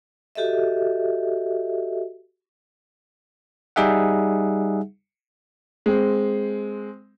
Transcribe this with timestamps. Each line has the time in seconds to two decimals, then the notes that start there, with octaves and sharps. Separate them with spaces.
0.35 F#4 G4 A4 D#5 E5
3.76 G3 D#4 G#4 E5 F#5
5.86 G#3 C4